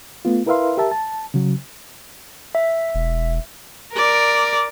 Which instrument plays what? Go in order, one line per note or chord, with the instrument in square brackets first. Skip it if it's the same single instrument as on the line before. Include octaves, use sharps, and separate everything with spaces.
[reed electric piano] A3 B3 F4
E4 A#4 B4 E5 F5 C6
G4 A#4 E5 A5
A5
C#3 F#3
[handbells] E5
[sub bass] E1
[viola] A#4 D5